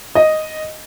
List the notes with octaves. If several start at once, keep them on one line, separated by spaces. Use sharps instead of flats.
D#5